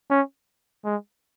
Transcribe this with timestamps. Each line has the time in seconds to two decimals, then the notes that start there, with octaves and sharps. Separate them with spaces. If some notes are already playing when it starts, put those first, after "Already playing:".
0.10 C#4
0.85 G#3